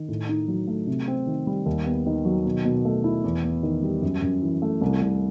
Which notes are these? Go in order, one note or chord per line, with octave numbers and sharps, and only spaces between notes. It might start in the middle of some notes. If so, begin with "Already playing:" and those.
Already playing: D#3
A2
D#4
F#3
A3
C3
C4
D#3
G3
D#2
B3
D#3
F#3
B2
B2
A3
E4
E2
B3
D#3
G3
F#2
F#2
E3
A3
C2
C2